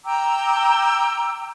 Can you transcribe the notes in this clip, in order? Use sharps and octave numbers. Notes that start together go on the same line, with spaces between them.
G5 A#5 D6 E6